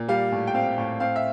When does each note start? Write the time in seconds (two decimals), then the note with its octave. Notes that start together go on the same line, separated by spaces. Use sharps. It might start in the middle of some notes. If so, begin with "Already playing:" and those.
Already playing: A#2
0.08 G3 F5
0.32 A2
0.47 G5
0.54 C4 F5
0.78 A2
1.00 C4 F5
1.16 E5